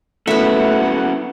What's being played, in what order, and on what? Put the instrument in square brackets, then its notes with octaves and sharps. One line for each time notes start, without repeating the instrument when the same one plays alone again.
[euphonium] A3 [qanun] B3 E5 [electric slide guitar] C#4 E4 F#4 [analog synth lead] F#5